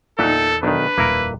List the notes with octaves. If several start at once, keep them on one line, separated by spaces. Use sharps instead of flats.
E2 A#2 D#4 A4 E5 F#5
B1 D#3 D4 B4
D#1 F2 A#3 E4 A#4